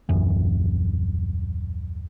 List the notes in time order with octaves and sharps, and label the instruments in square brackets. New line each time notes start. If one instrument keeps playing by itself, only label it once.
[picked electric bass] D#1 A#1 F#2 E3